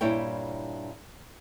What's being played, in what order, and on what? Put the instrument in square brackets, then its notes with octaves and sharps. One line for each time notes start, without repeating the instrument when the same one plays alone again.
[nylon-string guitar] G2 A#2 D4 E4 C#5 G5